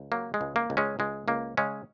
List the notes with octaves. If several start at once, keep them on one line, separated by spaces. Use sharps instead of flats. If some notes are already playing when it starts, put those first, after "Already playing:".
Already playing: C#2
F#3 A#3
G#3
C#2
A#3
C#2
G#3 C#4
C#2 G#3
C#2 A#3
C#3 G#3 C#4